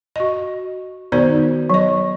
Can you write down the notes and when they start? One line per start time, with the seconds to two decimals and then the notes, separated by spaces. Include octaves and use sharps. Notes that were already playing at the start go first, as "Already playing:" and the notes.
0.16 F#4 D#5
1.12 D#3 B3 D#4 F#4 C5 D5
1.70 F#3 D#5